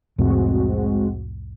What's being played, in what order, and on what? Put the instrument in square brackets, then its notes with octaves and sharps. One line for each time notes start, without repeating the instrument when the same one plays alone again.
[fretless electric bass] C2 F2 A2 [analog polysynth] G#3 C4 F#4